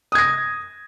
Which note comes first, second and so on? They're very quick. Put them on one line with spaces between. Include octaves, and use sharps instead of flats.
D#6 G#6 A#6